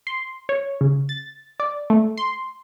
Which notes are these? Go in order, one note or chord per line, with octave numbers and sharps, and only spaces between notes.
C6
C#5
C#3
A6
D5
A3
C6